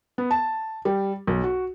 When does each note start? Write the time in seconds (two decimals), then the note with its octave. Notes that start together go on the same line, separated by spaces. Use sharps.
0.18 B3
0.31 A5
0.85 G3
1.27 B1
1.44 F#4